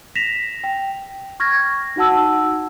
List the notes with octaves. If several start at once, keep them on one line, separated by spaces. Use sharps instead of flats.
A#6 B6 E7 F7
G5
C#6 F6 G#6 A#6
D#4 F#4 F#5 A5 E6